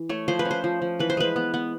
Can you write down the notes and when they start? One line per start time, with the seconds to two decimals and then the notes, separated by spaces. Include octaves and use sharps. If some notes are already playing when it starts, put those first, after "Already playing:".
Already playing: E3
0.09 A3 C#5
0.28 F3 C5
0.39 B4
0.45 C#4
0.51 C5
0.64 F3
0.82 F3
0.99 E3 B4
1.10 C5
1.17 G#3 B4
1.36 B3
1.54 B3